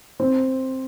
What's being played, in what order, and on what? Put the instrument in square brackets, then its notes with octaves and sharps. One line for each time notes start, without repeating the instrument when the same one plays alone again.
[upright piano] C4